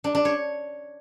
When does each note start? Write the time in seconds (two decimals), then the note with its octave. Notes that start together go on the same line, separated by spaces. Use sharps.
0.04 D4
0.15 D4
0.25 C#5